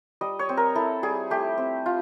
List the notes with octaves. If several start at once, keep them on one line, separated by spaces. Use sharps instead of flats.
G3 D#5
C#5
C4
A#4
E4 A4
G3 G#4
A3 G4
C4
F4